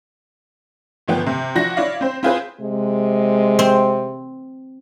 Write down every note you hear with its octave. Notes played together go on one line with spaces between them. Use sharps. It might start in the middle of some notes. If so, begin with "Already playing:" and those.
G1 F3 B3 G5
C3
F3 D4 E4 F#4 A#6
E4 C#5 D5 F5
C4 C5
C4 E4 F4 G#4 B4 C5
C3 G#3
C4